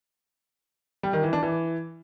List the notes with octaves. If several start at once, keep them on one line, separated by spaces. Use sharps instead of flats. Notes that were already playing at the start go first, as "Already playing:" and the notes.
G3
D#3
E3
D4
E3